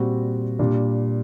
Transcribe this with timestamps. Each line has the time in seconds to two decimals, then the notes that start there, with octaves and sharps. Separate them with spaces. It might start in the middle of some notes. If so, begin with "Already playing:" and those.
Already playing: A#2 G3 C4 F#4
0.59 A#2 G3 D4